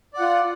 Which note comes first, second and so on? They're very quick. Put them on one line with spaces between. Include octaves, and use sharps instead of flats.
D5 F#5 F4